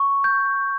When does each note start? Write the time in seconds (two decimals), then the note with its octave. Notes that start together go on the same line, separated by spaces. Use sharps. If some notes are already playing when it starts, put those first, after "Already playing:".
Already playing: C#6
0.24 G6